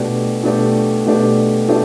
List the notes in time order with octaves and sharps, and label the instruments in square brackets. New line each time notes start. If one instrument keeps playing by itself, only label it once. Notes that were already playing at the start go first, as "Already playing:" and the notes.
Already playing: [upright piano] B2 A3 D4 G4
B2 A3 D4 G4
B2 A3 D4 G4
B2 A3 D4 G4